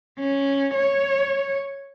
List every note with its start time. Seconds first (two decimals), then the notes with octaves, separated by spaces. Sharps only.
0.19 C#4
0.75 C#5